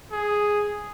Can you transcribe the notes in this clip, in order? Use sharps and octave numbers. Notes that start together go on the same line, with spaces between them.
G#4